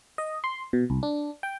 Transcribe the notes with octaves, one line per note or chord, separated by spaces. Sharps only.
D#5
C6
B2
C2
D4
G5